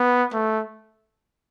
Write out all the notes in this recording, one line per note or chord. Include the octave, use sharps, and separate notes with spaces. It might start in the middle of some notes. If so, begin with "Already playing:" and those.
Already playing: B3
A3